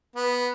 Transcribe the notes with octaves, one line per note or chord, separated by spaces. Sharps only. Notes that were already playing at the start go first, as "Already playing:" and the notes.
B3